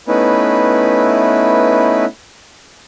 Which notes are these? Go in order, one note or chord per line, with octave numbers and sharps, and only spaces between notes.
A3 B3 C#4 D#4 E4 B4